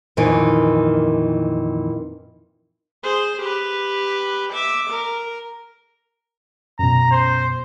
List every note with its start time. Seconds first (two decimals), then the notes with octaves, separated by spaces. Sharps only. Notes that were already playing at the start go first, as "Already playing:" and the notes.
0.17 F2 A#2 D#3 E3 G#5
3.03 G#4 C5
3.41 G4 B4
4.53 E5 D6
4.90 A#4
6.79 F#2 B2 A#5
7.11 C5